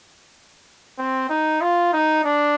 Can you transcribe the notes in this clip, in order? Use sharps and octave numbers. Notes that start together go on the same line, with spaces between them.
C4
D#4
F4
D#4
D4